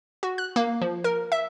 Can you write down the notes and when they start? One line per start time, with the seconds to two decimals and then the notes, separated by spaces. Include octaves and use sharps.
0.23 F#4
0.38 F#6
0.56 A#3
0.81 F3
1.04 A#4
1.32 E5